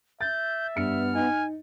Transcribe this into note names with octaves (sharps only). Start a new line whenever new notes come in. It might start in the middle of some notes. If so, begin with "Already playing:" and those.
E5 G6 A6
G2 B3 F6 C#7
D#4 G#5